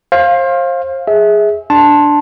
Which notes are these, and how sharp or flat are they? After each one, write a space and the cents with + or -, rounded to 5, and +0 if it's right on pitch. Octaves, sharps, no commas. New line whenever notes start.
C5 +35 F5 +0
G#4 +0 E5 -25
D4 +0 A5 +0 C6 +15